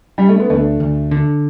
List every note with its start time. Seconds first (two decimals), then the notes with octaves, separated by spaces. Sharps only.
0.18 G3
0.29 A3
0.40 B3
0.50 D2 A3 D4
0.80 D2
1.11 D3